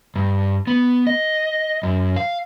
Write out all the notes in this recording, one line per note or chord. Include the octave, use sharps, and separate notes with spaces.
G2
B3
D#5
F#2
F5